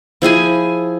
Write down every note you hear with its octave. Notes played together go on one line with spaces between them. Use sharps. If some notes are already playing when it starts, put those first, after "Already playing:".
F3 E4 G#4 G#5